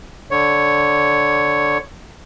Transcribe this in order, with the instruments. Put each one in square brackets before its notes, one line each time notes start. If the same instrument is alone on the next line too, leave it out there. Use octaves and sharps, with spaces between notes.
[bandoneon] D3 C#5